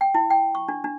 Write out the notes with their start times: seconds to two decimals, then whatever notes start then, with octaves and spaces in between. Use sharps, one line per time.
0.01 G5
0.15 E4
0.30 G5
0.55 C#6
0.68 D4
0.84 D4